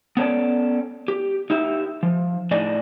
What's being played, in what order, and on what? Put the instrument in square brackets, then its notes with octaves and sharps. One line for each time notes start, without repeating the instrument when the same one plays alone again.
[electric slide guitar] B3 C#4 A4 C#5 D5 A5
G4
D#4 G4 E5
F3
A2 D4 D#4 G#4 D5 D#5